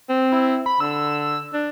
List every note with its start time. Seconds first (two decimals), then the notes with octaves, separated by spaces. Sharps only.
0.09 C4
0.32 E4
0.66 B5
0.80 D3 E6
1.53 D4